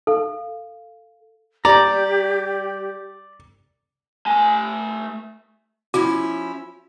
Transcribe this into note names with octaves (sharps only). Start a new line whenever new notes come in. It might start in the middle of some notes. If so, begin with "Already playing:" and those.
A4 F5
G3 G4 D5 A#5
A3 G#5
F3 C#4 E4 F#4